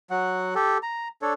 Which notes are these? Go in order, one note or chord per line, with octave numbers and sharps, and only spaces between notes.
F#3 F#5
G4 A4
A#5
D4 A4 C#5